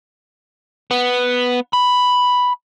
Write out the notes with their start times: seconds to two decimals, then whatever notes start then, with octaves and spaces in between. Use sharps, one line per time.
0.91 B3
1.73 B5